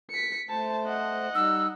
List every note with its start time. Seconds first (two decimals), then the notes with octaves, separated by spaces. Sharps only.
0.10 B6 C#7
0.49 A3 C5 A5
0.86 D#5 F#5
1.35 G3 D#4 E6